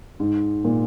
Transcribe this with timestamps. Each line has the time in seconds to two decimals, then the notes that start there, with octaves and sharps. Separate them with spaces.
0.20 G#2
0.65 A#2